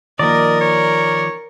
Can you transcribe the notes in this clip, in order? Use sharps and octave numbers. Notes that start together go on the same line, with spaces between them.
D#3 F3 A#3 A#4 D5 D#5
C#5